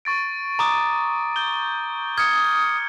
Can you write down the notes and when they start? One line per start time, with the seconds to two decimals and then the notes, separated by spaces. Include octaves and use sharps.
0.05 C#6 A6 D7
0.59 A#5 D6 D#6
1.36 G6 G7
2.18 D#6 F6 G#6 C#7